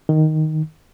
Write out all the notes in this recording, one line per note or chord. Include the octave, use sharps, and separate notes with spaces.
D#3